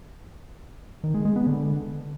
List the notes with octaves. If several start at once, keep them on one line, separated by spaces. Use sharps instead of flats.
D#3
G#3
G#3
B3
D3